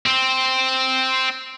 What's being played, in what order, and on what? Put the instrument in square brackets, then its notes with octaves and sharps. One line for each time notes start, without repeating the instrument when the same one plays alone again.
[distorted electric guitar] C4